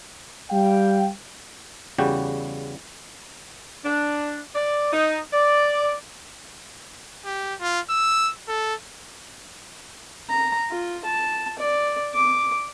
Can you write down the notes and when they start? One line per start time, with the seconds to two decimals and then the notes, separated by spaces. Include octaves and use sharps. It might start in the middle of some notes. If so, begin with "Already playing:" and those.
0.50 G3 F5 G5
1.98 E2 C#3 G3 F#4 G5
3.84 D4
4.55 D5
4.93 D#4
5.33 D5
7.25 G4
7.61 F4
7.90 E6
8.48 A4
10.30 A#5
10.71 F4
11.05 A5
11.59 D5
12.14 D6